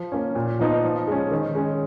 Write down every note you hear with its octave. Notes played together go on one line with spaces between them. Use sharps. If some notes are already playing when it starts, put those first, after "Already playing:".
Already playing: F3
A#3 C#4
A#2
F3 B3 D#4
F3
G#3 C#4
D#3
G#3 C#4